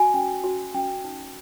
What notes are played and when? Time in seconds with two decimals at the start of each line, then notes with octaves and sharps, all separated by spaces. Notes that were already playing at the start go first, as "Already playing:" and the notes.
Already playing: F#4 G#5
0.14 C#4
0.44 F#4
0.74 C#4
1.04 D#4